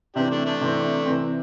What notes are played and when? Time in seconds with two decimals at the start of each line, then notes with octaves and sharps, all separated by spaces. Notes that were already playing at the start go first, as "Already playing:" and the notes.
0.16 C3 E3 C4 D4 G4
0.30 A3 D4
0.45 A3 D4
0.61 C3 E3 C4
1.06 C3 E3 C4